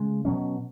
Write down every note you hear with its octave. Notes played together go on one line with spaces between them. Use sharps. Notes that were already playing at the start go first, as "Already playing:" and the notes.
Already playing: C#3 G#3
B2 F#3 C#4